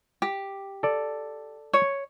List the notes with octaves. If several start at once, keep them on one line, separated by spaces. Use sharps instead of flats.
G4
A4 D5
C#5